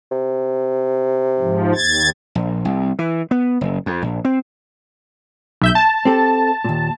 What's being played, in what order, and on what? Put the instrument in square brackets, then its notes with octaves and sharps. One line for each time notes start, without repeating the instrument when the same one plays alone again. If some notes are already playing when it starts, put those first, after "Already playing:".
[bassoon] C3
[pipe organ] G#2 F3
D#2 G#6 A6
[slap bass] A#1
C2
E3
B3
F#1
F2
A#1
C4
[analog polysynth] B1 E5 G6
A5
[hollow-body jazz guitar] C4 G4 A4
D#2 A#2